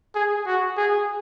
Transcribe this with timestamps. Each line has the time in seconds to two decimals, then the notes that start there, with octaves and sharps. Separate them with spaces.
0.15 G#4
0.46 F#4
0.77 G#4